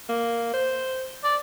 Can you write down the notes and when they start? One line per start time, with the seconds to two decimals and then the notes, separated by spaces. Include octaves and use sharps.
0.09 A#3
0.53 C5
1.24 D5